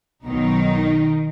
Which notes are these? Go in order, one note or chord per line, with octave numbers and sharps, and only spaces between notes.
B1 B2 D#3 F#3 D#4